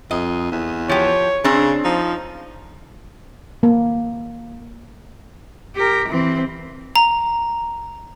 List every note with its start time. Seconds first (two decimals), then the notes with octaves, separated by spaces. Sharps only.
0.11 F2 D#5
0.52 E2
0.89 F3 G4 C#5
1.44 C#3 C4 D4
1.84 F3 D#4
3.63 A#3
5.75 G4 A#4
6.08 E3 C4
6.96 A#5